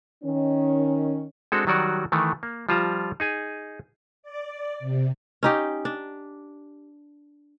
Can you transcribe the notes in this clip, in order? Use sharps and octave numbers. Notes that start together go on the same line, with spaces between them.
D#3 C#4
G#3 C4 D4 F#4 A4
D#3 F#3 G3 F#4 D5
D#3 E3 A3
A#3
F3 G3 F4 A5 A#5
D#4 G#4 G#5
D5
C3
C#4 D#4 G4
D4